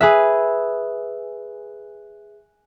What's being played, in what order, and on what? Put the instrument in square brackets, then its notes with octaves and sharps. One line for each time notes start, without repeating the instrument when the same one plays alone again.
[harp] G#4 B4 E5